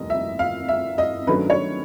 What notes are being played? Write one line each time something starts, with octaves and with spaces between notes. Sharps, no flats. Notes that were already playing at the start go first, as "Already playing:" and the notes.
Already playing: F1 D#2 G3 C4 D#5
E5
F5
E5
D#5
G2 D#3 F#3 A3 C#4 B4
C#5